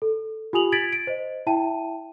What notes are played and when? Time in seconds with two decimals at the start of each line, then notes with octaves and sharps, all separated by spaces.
0.02 A4
0.53 F4 G4 G#5 D#6 F7 F#7
0.72 G#6 A6 B6 D7 F#7
0.93 D7
1.07 C5 D#5
1.47 E4 E5 G5 A5 D#7